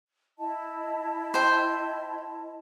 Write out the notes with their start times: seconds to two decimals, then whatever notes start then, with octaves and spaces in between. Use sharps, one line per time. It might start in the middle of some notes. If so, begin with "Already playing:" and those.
0.38 E4 D#5 A5
1.34 C5 G5